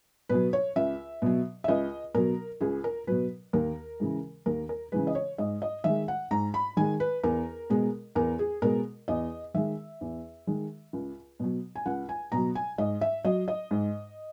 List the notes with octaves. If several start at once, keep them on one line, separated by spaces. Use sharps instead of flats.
B2 F#3 B4
C#5
C#2 E5
B2 F#3
E5
C#2 D#5
B2 F#3 A#4
C#2 G#4
A#4
B2 F#3 B4
D#2 A#4
C#3 E3 G#3
D#2 A#4
A#4
C#3 E3 G#3 B4
D#5
C#5
G#2 D#5
D#5
D#3 G#3 E5
F#5
G#2 A#5
B5
D#3 G#3 G#5
B4
E2 A#4
B2 G#3
E2 A#4
G#4
B2 G#3 A#4
E2 D#5
D#3 G#3 E5
E2
D#3 G#3
C#2
B2 F#3
G#5
C#2 F#5
G#5
B2 F#3 A#5
G#5
G#2 D#5
E5
F#3 D#5
D#5
G#2